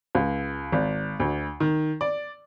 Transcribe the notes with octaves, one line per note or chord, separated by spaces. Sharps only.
C#2
G#1
D2
D#3
D5